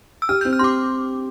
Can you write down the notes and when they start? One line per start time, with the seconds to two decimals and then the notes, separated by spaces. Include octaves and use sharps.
0.22 E6
0.29 G4 F6
0.41 G6
0.45 C4
0.53 F6
0.59 G4 C6 D6